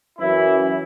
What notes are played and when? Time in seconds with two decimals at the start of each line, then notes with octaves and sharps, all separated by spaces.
0.19 F#2 E3 E4